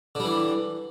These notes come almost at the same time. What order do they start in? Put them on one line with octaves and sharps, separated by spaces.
D3 G3 E3